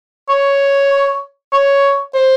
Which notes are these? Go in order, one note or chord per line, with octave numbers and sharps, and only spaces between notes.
C#5
C#5
C5